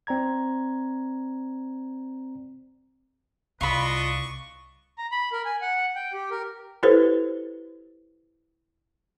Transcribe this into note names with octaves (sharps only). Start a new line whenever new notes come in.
C4 D5 A#5 G#6
C2 D4 F4 B4 D#5 B5 C#6
A#5
B5
A#4
G#5
F#5
G5
G4
A#4
E4 G4 A4 B4 C5